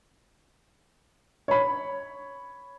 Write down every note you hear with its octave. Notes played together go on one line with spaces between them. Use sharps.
C#5 B5